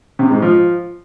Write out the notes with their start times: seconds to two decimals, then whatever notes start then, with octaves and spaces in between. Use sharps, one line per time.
0.19 C3
0.31 G#2
0.42 F3